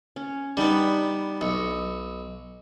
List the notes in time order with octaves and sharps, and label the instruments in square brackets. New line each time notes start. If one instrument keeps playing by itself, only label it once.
[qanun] C#4
[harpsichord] G3 B3 [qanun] D4 D#4
[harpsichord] B1 [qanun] D#5 C#6